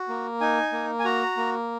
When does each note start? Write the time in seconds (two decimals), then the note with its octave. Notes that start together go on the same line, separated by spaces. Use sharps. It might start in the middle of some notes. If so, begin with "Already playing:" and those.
Already playing: F#4
0.08 A#3
0.41 D#4 G#5
0.72 A#3
0.99 G#5
1.05 F#4 A#5
1.37 A#3